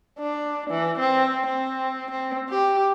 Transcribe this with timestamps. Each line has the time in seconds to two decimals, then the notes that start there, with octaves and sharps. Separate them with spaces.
0.19 D4
0.70 E3
0.99 C4
1.46 C4
2.11 C4
2.49 G4